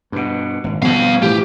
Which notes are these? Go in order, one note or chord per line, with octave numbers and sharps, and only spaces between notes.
G2 B2
G#1
B2 F3 G3 C4 F5
A2 E3 F3 G4